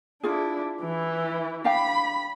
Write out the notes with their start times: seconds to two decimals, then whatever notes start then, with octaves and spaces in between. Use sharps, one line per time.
0.23 D4 E4 F4 G#4
0.82 E3 E4
1.64 D4 F5 G5 B5